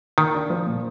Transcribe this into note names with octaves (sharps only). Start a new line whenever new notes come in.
D#3 A#3
D4
F3
A#2